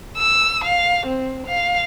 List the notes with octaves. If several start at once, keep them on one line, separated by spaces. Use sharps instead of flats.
E6
F5
C4
F5